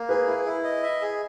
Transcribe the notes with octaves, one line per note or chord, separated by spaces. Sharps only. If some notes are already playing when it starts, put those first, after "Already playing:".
Already playing: A#3
G#4 B4
E4
E4
D#5
E5
G#4